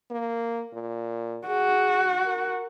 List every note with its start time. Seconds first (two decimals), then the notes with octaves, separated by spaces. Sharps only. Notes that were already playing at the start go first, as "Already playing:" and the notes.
0.11 A#3
0.73 A#2
1.48 F#4 G#4
2.24 A#4